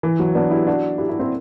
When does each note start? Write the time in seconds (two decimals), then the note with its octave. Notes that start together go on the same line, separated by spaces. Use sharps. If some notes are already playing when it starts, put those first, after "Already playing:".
0.03 E3
0.19 F#3
0.35 B3 D4
0.51 E4 G4
0.67 D4 F#4
0.98 E4 G4
1.09 E4 G4
1.19 C4 E4